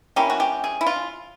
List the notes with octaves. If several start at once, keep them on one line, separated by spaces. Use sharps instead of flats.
G3 A#3 C#4 E4 G4
F#4
G4
G#4
E4
F4